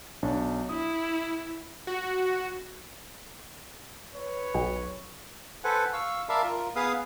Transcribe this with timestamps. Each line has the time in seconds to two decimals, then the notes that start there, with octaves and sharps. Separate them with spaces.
0.22 B1 D4 C#5
0.69 E4 D#6
1.87 F#4
4.15 B4 C#5
4.54 B1
5.64 A4 B4 C5 F#5 G#5
5.93 F5 C#6 E6
6.29 A#4 D5 E5 F5 A5 B5
6.43 F4 A#4
6.76 B3 G#4 B4 F5 D#6